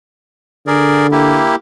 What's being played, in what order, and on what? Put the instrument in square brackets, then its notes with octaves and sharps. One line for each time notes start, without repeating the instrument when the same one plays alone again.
[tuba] D3 [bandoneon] G#4 A#4 D5
[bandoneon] A#3 E4 G4